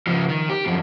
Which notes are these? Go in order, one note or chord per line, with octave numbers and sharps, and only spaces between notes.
C#2 F3
D#3
G4
F#2 F3